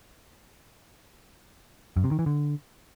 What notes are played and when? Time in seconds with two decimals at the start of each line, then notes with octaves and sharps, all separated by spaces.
1.97 F#2
2.04 C3
2.11 D#3
2.19 E3
2.26 D3